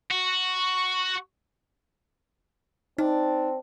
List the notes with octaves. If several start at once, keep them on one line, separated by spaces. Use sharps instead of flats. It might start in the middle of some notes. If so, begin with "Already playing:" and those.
F#4
C4 D4 D#4